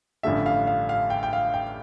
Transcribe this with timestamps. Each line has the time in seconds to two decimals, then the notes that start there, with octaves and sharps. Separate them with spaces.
0.23 A1 G2 D3 F3 A3 E5
0.46 F5
0.67 F5
0.89 F5
1.10 G5
1.23 G5
1.33 F5
1.54 G5